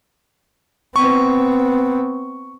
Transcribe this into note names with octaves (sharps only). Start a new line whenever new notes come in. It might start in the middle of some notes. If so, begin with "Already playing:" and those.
B3 C4 C#6